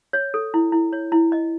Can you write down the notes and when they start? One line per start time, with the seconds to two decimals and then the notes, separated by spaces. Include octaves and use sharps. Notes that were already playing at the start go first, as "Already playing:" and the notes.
0.13 C#5
0.34 A4
0.54 E4
0.72 E4
0.93 C#5
1.12 E4
1.32 D#5